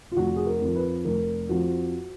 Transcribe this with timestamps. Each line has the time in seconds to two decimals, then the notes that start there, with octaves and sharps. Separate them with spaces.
0.12 F4
0.17 F1 F#4
0.36 G#4
0.46 A#4
0.61 F2 F3
0.76 B4
1.05 F1 A#4
1.49 F2 F3 F#4